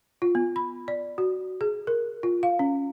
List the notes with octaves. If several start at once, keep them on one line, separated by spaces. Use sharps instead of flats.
F4
B3
B5
D5
F#4
G#4
A#4
F4
F5
C#4